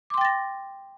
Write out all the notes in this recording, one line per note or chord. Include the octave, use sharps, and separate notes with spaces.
G5 C6 D6 A6 A#6